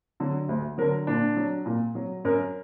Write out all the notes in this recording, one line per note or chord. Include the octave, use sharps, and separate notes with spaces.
D3 F#3
D2
D3 F#3 A#4
A#2 D4
F#3
A#2
F#3
F#2 A#4